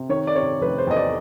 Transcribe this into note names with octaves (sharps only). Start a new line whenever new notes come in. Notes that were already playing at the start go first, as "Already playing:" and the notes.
Already playing: C3
D#3 C#5
D5
C3 C#5
F1 B4
C5
E2 D#5
D5